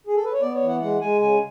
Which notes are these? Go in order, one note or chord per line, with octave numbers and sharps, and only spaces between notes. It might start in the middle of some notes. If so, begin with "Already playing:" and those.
G#4
A4
B4
C#5
B3 D5
C#5
E3
F#5
G#3 F#5
G#3 G#5
C#3 G#5